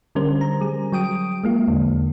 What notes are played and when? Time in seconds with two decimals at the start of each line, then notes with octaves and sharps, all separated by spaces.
0.15 D3 G3 C#4 A#4 C5
0.41 A#5
0.61 G3 G#4
0.92 F#3 G5 D#6 D7
1.44 G#3 A#3 F4
1.68 E2 D3